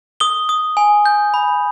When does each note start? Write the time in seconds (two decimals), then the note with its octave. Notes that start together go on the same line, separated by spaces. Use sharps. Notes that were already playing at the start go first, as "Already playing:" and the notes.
0.20 D#6 G7
0.49 D#6
0.77 G#5
1.06 G6
1.34 B5